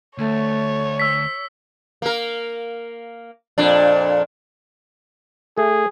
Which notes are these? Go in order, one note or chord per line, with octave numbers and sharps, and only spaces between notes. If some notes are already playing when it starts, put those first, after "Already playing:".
D2 A3 C#5
E6 B6
A#3 A#4
F2 A#2 D4
A3 G#4